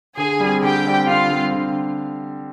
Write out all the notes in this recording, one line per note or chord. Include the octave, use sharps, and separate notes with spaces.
D3 G#4 G#5
G3 C4
D3 G4 G5
G3 C4
D3 F4 F5
G3 C4
D3